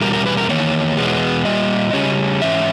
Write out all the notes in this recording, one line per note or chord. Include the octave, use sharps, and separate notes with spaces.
E2 B2 G3 A#4
A#4
B4
A#4
E2 D#3 A#3 C#5
E2 B2 G#3 B3
A#2 G3 D#5
C#3 G3 C#4
G#2 E3 C#4 E5